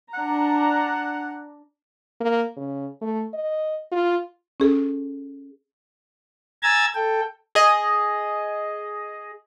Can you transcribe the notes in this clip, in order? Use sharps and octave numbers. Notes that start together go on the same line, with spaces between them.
D4 F#5 A#5
A#3
C#3
A3
D#5
F4
C#4 G#4 A4
G#5 A#5 E6 G#6 A6
A4 G5
G#4 D#5